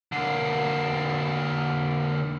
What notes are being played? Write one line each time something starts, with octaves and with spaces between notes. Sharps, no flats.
D3 A#3